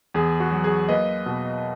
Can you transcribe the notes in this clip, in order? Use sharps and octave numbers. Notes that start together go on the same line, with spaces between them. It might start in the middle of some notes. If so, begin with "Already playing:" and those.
E2 G#4
F#4
F#3
G#4
A#3 B4 D#5
B2